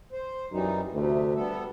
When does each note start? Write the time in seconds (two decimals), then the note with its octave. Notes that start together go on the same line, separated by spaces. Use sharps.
0.12 C5
0.52 F#2 E3 G3 D#4
0.93 D2 C3 A3
1.35 G3 B3 A4